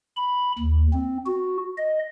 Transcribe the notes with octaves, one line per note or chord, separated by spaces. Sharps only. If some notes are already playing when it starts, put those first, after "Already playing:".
B5
D#2
C4
F#4
D#5